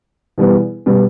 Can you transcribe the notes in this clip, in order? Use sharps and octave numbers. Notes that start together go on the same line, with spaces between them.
E2 B2 G3 B3
B2 G3 B3